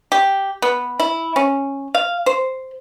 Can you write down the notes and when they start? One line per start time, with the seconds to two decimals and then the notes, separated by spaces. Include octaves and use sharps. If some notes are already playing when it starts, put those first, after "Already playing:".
0.12 G4
0.62 B3
1.00 E4
1.36 C#4
1.95 F5
2.26 C5